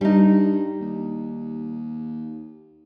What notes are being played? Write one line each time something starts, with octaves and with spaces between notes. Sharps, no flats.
G2 G3 D#4
D#2